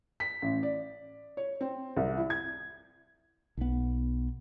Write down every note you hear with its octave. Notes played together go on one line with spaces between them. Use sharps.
B6
A1
D5
C#5
C4
C2
E4
G#6
B1 B3